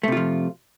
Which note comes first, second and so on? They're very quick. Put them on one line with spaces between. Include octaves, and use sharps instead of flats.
A3 C3 F4 F3